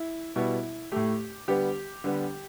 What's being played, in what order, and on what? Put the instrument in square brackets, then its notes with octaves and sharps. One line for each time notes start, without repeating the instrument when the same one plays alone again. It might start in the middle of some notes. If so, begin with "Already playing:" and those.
Already playing: [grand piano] E4
B2 G3 B3 E4
A2 A3 G4
D3 G3 B3 G4
D3 G3 B3